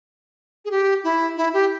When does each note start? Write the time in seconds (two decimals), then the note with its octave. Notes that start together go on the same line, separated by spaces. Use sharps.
0.65 G#4
0.71 G4
1.04 E4
1.37 E4
1.54 G4